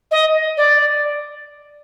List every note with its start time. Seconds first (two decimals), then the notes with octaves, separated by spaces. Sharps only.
0.11 D#5
0.57 D5